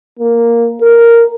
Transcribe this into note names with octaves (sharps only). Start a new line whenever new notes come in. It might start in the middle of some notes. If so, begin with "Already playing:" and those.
A#3
A#4